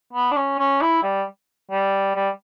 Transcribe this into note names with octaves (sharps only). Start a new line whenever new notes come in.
B3
D4
C#4
C#4
E4
G3
G3
G3